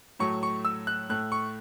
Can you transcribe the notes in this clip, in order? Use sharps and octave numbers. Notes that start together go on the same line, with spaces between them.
A2 F#3 A3 C#6
C#6
E6
F#6
A2 A3 F#6
C#6